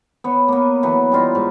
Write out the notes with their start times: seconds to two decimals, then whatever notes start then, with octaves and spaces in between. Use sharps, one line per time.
0.24 B3 C#5
0.48 A#3 B3
0.83 E3 F#3 B3
1.12 G3 D#4 F4 D#5
1.35 G#2